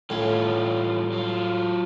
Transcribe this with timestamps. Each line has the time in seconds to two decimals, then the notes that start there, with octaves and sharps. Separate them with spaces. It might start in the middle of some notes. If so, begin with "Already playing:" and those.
0.10 A2 E3 G3 C#4 F4
1.12 F#3 F4